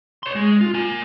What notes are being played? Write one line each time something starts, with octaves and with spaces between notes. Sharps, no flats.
C#5 C6
G#3
F4
A#3 G#5